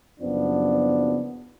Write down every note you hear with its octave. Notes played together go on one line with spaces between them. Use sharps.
F#1 F#2 F3 B3 D4